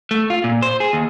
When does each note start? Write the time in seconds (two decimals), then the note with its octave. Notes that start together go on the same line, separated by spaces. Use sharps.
0.11 A3
0.30 F4
0.44 A#2
0.63 C5
0.80 G#4
0.93 D#2